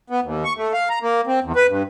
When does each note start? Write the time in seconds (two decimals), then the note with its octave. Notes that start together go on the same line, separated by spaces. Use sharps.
0.10 B3
0.24 D#2
0.45 C#6
0.57 A3
0.73 F5
0.90 A#5
1.02 A#3
1.27 C4
1.44 E2
1.56 B4
1.69 G2